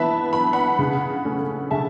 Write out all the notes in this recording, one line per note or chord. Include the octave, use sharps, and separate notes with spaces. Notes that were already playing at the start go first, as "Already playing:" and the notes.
Already playing: E3 B3 E5 A5 B5
B3 B5
F#5 B5
C#3
A3 C#4
C#3 E5 A5